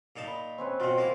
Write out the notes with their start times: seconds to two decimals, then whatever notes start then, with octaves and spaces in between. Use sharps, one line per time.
0.16 A#2 D#4 A5
0.28 B5
0.58 C4 C#4 B4
0.80 B2 C4 F4
0.98 A#3 E4